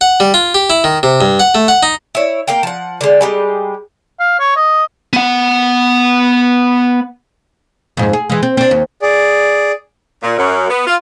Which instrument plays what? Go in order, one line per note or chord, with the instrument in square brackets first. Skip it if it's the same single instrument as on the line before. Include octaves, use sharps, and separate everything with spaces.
[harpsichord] F#5
G3
F4
G4
E4
D#3
C3
G2
F#5
A3
F#5
D#4
[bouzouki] E4 C#5
A#3 A#4 F5 G5
F3 F#5
D3 G#3
G3 G#3 G4
[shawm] F5
C#5
D#5
[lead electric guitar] B3 F#5
[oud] F2 G#2
G#4
E3 G#3
C4
C4 D4
D#2
[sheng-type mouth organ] G#4 D5
[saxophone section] A#2
F#2
B3
F4